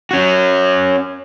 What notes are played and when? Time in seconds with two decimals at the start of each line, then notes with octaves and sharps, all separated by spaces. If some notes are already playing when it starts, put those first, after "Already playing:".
0.11 C#4 F#4